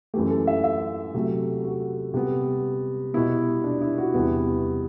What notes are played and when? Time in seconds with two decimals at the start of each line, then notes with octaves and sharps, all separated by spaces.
0.14 A3 G4
0.16 F#2 E3
0.30 A4
0.47 E5
0.64 E5
1.14 C3 F#3 A3
1.64 F#4
2.14 C3 G3 B3
3.14 B2 G3 B3 E4
3.64 D4
3.81 E4
3.98 F#4
4.14 E2 C3 G3 B3 E4